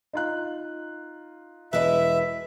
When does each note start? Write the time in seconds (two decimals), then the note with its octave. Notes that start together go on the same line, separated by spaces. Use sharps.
0.13 D#4 F4 F#6
1.73 E1 E4 B4 D#5 E5